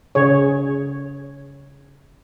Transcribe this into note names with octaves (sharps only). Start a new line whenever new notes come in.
C#3 G#4 C#5